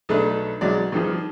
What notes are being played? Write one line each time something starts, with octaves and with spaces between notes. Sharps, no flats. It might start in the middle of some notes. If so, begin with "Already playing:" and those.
B1 A3 D4 A4 B4
B1 F#3 G#3 D5
G2 D#3 F3